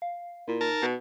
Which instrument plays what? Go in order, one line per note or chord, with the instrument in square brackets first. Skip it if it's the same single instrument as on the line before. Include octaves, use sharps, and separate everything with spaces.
[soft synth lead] F5
[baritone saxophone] A#2 [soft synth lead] E4
[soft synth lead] D#4 [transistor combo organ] A#4 A5
[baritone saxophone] B2